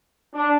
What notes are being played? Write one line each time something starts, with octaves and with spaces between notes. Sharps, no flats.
D4